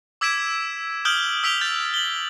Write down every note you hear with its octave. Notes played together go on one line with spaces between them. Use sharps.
D6 E6 G#6 B6 D7 E7
D#6 F6 G6 D7 F#7 G7
E6 B6 D7 F7 G7
G6 A6
F#7 G7